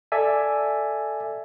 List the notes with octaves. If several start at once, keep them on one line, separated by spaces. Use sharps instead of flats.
A4 D5 E5 G#5